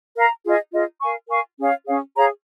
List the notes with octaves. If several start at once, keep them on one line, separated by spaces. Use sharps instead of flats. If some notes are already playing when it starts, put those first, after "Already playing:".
A#4 F5 A#5
F4 G#4 D#5
F4 G#4 D#5
A#4 F5 G#5 C#6
A#4 F5 G#5 C#6
C#4 G#4 C#5 F5
C#4 G#4 C#5 F5
G#4 C#5 F5 A#5